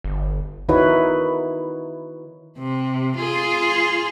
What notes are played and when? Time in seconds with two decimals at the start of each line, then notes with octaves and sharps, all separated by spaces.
0.04 G1
0.69 D#3 D#4 E4 F#4 B4 C#5
2.59 C3
3.17 F4 G#4